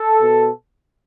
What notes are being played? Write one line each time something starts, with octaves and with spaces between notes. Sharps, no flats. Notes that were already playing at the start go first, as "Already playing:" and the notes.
Already playing: A4
B2